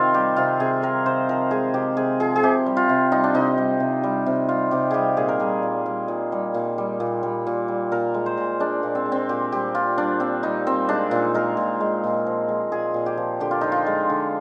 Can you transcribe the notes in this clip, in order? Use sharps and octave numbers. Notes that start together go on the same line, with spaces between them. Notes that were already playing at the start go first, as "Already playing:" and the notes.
Already playing: C3 D#3 C4 F4
G3 G4
C3 F4
C3 G#4
D#3 A#4
C3 C5
F3 A#4
G#3 G#4
C3 G4
C3 G#4
F3 G#4
G#4
C3 G4
G3
F4
C3
G3 D#4
D4
C3 D#4
G3
C3
G3
C3
G3 F4
C3 G4
G3 G4 G#4
A#2 G#4
A#4
G3 G#4
A#2
G3
A#2
G3
A#2
G3
A#2
G3
A#2
G3
A#2 A#4
G#3
C5
A#2
G#3 D4
A#2
C4
G#3
C4
A#2 G4
G3 G4
A#2 F4
G3 D4
A#2 C4
G3 D#4
A#2 C4
G#3 D4
A#2 D#4
G#3 A#4
A#2
G#3
A#2
F3
G#3
A#2 G#4
A#2
G4
F3
D3 G4
F4
F3 D#4
F4
G#3
D3